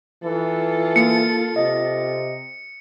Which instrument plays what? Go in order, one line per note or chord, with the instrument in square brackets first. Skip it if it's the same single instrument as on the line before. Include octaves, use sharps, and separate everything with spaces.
[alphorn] E3 [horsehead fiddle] F4 A4
[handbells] A#3 [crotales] C#7
[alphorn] C3 [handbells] D#5